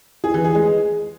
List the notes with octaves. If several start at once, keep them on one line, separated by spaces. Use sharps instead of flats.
G#4
E3
G#4
G#3